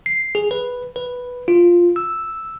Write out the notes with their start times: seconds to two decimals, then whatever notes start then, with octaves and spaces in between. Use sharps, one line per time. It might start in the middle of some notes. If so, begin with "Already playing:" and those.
0.06 C7
0.35 G#4
0.51 B4
0.96 B4
1.48 F4
1.96 E6